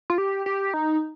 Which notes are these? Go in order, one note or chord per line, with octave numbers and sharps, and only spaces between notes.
F4
G4
G4
D#4